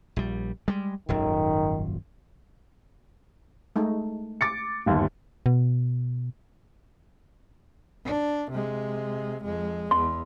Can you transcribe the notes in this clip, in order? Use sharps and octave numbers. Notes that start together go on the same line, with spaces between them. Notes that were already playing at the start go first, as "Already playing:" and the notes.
A#1 G3
G3 G#3
D#1 G#1 F#2 D#3
G#3 A3 D#4
D6 A6 C#7
G1 D#2
B2
D4
C3 G#3
F2 G#3
E2 C6